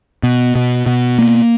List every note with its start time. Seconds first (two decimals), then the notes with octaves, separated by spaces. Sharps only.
0.23 B2
0.56 B2
0.86 B2
1.18 A#3